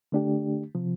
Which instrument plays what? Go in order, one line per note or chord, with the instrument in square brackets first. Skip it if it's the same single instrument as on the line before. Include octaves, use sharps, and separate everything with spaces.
[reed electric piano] D3 A3 D4 G4
C3 F3